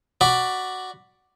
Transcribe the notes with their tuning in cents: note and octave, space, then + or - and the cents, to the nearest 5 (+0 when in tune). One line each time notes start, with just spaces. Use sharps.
F#4 +5 D5 +5 B5 +0